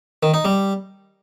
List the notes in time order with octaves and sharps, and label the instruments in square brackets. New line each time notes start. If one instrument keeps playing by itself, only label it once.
[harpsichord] D#3
D#4
G3